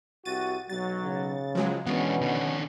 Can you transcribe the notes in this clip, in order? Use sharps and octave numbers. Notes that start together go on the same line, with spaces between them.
C2 F#4 A6 D#7
B1 F#3 A6
C#3
C#2 F3 F#3 G#3
B2 D3 E3 G#3 B3 C#4
D#3 D4